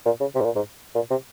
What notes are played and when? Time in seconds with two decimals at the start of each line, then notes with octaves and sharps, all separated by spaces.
0.05 A#2
0.20 C#3
0.35 C3
0.41 G#2
0.45 A#2
0.56 G#2
0.95 A#2
1.10 C3